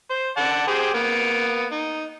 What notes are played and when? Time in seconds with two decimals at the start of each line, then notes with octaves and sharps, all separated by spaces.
0.10 C5
0.37 D5 F#5 A5
0.67 G4 G#4 C5
0.94 A#3 B3
1.72 D#4